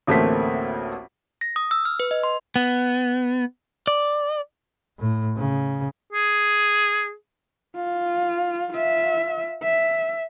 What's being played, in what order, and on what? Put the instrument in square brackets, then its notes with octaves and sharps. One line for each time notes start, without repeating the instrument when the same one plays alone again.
[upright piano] A1 D2 A3 A#3 C4 B6
[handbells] A#6
D#6
E6
F6
B4
D#5
C6
[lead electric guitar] B3
D5
[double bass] A2
C#3
[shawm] G#4
[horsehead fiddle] F4
F4 E5
E5